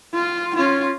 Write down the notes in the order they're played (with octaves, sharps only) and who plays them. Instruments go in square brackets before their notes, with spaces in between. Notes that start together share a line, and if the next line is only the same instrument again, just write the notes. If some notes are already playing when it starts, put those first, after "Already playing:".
[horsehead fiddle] F4
C#4 F4